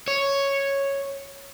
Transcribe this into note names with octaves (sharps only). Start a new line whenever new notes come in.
C#5